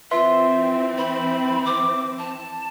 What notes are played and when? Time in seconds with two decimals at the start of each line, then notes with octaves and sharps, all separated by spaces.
0.11 E3 C4 F4 B4 E5 C6
0.98 B5
1.66 D6
2.19 A5